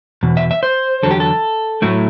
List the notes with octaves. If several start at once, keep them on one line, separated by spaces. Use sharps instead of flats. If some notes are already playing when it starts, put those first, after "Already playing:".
E2 B2
E5
E5
C5
E2 D3 F#3 A4
G4
A4
A2 F#3 A3 E4